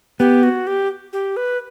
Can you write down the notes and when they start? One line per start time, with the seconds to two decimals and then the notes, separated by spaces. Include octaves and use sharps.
0.19 B3 G4
0.43 F#4
0.67 G4
1.13 G4
1.37 B4